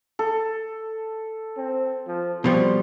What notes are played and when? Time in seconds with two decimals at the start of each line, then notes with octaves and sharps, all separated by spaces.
0.19 A4
1.57 C4
2.07 F3
2.44 B2 F3 G3 C4